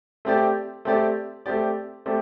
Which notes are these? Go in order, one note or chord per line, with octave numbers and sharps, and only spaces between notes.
A3 C4 G4 D5
A3 C4 G4 D5
A3 C4 G4 D5
A3 C4 G4 D5